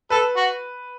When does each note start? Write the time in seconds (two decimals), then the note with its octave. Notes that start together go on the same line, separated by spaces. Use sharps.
0.10 A4 B4
0.37 F#4